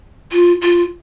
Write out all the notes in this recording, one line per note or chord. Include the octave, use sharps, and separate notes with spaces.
F4
F4